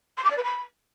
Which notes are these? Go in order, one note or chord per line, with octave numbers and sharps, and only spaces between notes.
C6
D6
D5
B4
B5